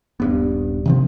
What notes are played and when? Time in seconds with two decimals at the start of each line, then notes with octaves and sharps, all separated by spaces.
0.20 D#1 G2 B3
0.86 C3 D#3 F3